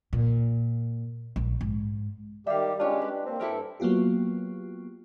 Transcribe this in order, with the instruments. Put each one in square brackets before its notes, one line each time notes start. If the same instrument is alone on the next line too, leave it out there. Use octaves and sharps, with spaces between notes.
[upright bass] A#2
A#1
G#2
[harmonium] D#3 G4 [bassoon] G3 [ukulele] E5 F5
[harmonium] G#3 C#4 G4 [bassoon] D4 [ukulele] F4 C#5
[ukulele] B4
[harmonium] A#3 [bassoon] C4
[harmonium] G2 A4 [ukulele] E4 G4 A#4
[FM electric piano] F#3 A#3 B3 F4 G4